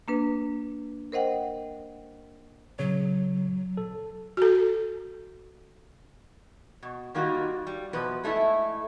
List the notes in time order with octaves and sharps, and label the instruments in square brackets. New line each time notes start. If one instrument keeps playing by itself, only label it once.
[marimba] A#3 D4 B4
A#4 C5 D#5 F#5 G5
[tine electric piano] C#3 C#5 [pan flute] F#3
[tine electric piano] A4
[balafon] F#4 A4
[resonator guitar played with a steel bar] B2
D#3 G3 A#3 D#4 F4 F#4
G3
E2 B2 F3 B4
G#3 A3 D#4 E4